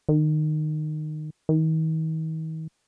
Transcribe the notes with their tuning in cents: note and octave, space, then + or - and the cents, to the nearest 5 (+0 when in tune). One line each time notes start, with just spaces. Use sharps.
D#3 -20
D#3 +40